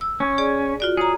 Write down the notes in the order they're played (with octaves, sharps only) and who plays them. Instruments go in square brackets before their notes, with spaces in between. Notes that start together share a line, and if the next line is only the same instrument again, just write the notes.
[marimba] E6
[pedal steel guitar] C#4
[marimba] G#4 D5
F4 F#4 D5
[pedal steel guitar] G#4 [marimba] C#5 A#5